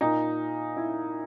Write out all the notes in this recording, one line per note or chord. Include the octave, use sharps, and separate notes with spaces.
A#2 D#4
E4